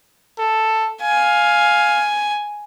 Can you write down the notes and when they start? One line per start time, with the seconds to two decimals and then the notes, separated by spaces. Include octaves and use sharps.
0.40 A4
1.02 F5 G#5